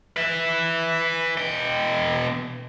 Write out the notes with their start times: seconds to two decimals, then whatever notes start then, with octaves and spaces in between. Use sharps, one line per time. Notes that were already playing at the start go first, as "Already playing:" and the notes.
0.17 B4 E5
1.38 B2 G5